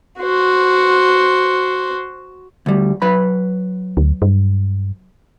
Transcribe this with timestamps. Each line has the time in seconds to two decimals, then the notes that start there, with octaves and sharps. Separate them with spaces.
0.21 F#4 C5
2.66 D2 G3
3.02 F#3 B4 B5
3.97 D2
4.22 G2